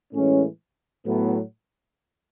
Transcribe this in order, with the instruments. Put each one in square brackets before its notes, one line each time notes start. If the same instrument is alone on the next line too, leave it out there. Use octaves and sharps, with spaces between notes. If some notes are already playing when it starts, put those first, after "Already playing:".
[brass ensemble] A2 E3 G#3 C#4
A2 F#3 B3